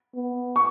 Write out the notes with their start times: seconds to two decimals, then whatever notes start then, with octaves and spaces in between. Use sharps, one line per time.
0.15 B3
0.56 C#6